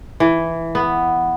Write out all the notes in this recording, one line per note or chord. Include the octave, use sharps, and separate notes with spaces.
E3
B3